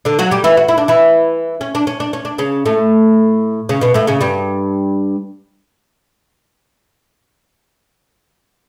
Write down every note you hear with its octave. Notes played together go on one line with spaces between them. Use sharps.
D3 D4
F#3 F#4
G3 G4
E3 E4
F#4
E4
D4
E3 E4
C#4
D4
C#4
D4
C#4
D4
C#3 C#4
A2 A3
C#3 C#4
B2 B3
A2 A3
C#3 C#4
G2 G3